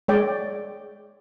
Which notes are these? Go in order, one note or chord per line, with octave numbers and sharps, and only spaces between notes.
G#3 C#5 D5 G5